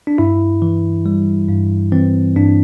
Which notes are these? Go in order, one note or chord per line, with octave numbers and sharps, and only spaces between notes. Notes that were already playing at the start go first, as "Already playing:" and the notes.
D4
G2 E4
E3
G3
G2
E3 C4
G2 D4